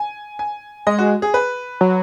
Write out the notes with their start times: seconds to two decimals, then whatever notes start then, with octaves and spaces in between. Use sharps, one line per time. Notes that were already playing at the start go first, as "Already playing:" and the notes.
Already playing: G#5
0.39 G#5
0.87 G#3 D#5
0.99 F#4
1.22 G#4
1.34 B4
1.81 F#3